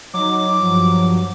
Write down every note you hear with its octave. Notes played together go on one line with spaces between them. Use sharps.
F#3 D#4 D6
G2 F3